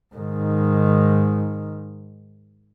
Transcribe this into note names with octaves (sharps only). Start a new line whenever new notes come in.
G#2 D#3